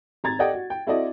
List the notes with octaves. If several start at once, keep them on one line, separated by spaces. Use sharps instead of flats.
G#1 A#5 G#6 A6
G4 A4 D5 D#5 F#5 G5
F#4
G5
C4 E4 F#4 A4 D5 D#5